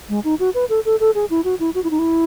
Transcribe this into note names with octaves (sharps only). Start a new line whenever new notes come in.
G#3
D#4
F#4
B4
A4
A4
A4
G#4
E4
F#4
E4
F#4
E4
D#4
E4